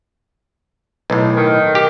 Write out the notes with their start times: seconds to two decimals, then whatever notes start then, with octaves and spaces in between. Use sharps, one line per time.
1.10 B1 A2
1.36 D#3
1.75 G4